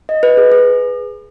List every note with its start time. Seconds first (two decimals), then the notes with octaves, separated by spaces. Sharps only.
0.09 D#5
0.23 B4
0.37 G#4
0.52 G#4